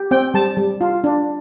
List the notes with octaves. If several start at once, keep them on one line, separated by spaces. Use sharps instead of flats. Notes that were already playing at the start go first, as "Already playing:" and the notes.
Already playing: G4
C4 G5
G3 A5
G3
F4
D4